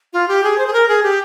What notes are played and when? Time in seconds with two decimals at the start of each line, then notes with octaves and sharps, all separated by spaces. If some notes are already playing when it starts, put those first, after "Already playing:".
0.13 F4
0.28 G4
0.44 G#4
0.58 C5
0.67 G#4
0.73 A#4
0.88 G#4
1.03 G4